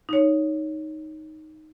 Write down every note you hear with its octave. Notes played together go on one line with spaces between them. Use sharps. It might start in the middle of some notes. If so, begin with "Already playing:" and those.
D#4 C#5